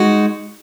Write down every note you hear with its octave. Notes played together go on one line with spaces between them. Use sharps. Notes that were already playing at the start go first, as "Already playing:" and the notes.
Already playing: G#3 D#4 F#4